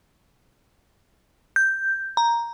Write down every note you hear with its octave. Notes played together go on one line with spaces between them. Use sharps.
G6
A#5